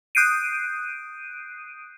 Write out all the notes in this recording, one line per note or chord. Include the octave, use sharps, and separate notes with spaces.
D#6 F#6 G6 C7 D7 D#7